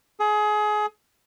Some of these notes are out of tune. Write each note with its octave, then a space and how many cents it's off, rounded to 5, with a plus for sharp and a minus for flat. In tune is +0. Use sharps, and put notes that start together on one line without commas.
G#4 +25